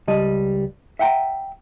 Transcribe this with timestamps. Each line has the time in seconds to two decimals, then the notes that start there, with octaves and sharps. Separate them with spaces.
0.08 C#2 G3 D#5 A5
0.99 E5 F#5 G5 A5 A#5